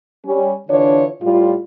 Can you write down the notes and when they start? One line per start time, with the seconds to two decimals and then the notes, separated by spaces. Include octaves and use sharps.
0.25 G3 C#4
0.68 D3 E3 D4 F4 C#5
1.21 A2 G3 F4